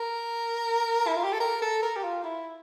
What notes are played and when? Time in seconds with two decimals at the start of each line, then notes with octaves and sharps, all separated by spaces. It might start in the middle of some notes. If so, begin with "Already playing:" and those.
Already playing: A#4
1.07 E4
1.16 F4
1.24 G4
1.32 A4
1.40 A#4
1.62 A4
1.83 A#4
1.96 G4
2.04 F4
2.24 E4